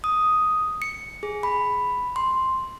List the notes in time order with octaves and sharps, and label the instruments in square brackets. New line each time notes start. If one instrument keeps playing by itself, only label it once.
[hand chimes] D#6
C#7
G#4
B5
C6